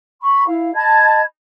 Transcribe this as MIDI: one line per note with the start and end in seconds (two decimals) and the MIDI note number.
0.21 0.45 83
0.21 0.45 85
0.47 0.74 64
0.47 0.74 77
0.74 1.21 75
0.74 1.21 81
0.74 1.21 83
0.74 1.21 92